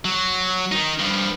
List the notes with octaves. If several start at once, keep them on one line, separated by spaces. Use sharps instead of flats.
F#3
D#3 D#4
G2 F3